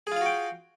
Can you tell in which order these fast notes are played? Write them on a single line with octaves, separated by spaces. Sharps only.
G#4 F4 F5 F#4 G5